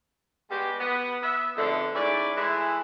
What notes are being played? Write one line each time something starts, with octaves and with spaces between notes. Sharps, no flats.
G3 G#3 B3 F#4 G4
B3
B3 E5
F2 G#2 B2 D3 A3
G#2 C#4 E4 D5
E3 G#3 A3 E4